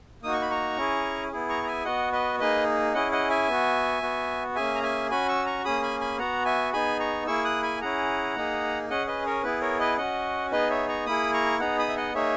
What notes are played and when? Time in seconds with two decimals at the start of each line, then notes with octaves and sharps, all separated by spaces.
0.23 A#3 D#4 F#4 D#6
0.33 C#6
0.42 B5
0.51 A#5 C#6
0.77 C#4 E4 G#4
1.32 B3 E4 G#4
1.49 A#5 C#6
1.63 A#5
1.67 E5 G#5
1.85 B3 F#4 D#5 F#5
2.12 B4 D#5
2.39 A#3 D#4 G#4 B4 D#5
2.94 C#4 E4 G#4 D#5 F#5
3.12 D#5 F#5
3.30 E5 G#5
3.48 B3 F#4
4.02 B3 F#4
4.56 A#3 C#4 G#4 E5 G#5
4.75 A#5
4.83 E5 G#5
5.11 C#4 F#4 G#5 B5
5.28 C#6 E6
5.46 A#5 C#6
5.65 A#3 C#4 G#4 B5 D#6
5.82 G#5 B5
6.00 G#5 B5
6.18 B3 F#4 F#5 A#5
6.45 E5 G#5
6.73 B3 D#4 G#4 G#5 B5
7.00 A#5 C#6
7.27 A#3 E4 G#4 C#6 E6
7.44 D#6 F#6
7.63 G#5 B5
7.81 C#4 E4 G#4 F#5 A#5
8.36 A#3 D#4 G#4
8.90 C#4 G#4 D#5 F#5
9.07 B4 D#5
9.26 A#4 C#5
9.43 B3 E4 G#4 B4
9.61 A#4 C#5
9.80 B4 D#5
9.98 C#4 F#4 D#5 F#5
10.52 B3 D#4 G#4 B4 D#5
10.70 C#5 E5
10.88 A#5 C#6
11.06 A#3 E4 G#4 B5 D#6
11.34 A#5 C#6
11.60 B3 D#4 G#4 F#5 A#5
11.78 B5 D#6
11.89 E5
11.97 D#5 F#5
12.14 A#3 D#4 G#4 C#5 E5